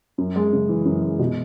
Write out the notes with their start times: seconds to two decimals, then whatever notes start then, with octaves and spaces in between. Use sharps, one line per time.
0.18 F#2
0.36 G#3
0.53 C#3
0.69 E3
0.85 F#2
1.02 G#3
1.19 B2